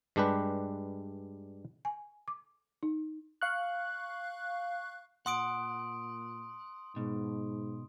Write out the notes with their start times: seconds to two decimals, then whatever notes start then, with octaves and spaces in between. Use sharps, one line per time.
0.16 G2 G#3 D4 G4 B4
1.85 G#5
2.28 D6
2.83 D#4
3.42 F5 C#6 F#6
5.26 A#2 F#5 C6 D#6 D7
6.96 G#2 B2